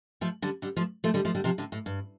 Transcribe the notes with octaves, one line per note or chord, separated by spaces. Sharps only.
F3 A3
D3 G3
D3 G3
F3 A3
F3 A3
D3 G3
F3 A3
D3 G3
C3 F3
A2 D3
A2
G2